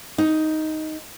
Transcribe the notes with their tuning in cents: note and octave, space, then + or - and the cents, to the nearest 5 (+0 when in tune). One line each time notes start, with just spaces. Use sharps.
D#4 +5